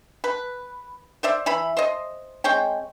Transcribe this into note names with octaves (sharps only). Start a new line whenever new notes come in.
B4
C5 D5 E5
E3 E5 B5
C5 D#5
G#3 C4 C#5 G5